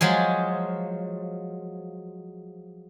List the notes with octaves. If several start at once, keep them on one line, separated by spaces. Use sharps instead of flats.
F3 F#3 G#3 G#4